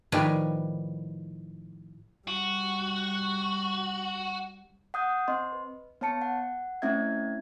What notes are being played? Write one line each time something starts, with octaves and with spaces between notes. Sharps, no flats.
A2 D#3 F3 G3 B4 G#5
G3 F#4
F#5 D#6 G6
C4 D#5 C6
B4
B3 C#5 A5 C#7
F#5
A3 C4 C#4 E4 E5 G#6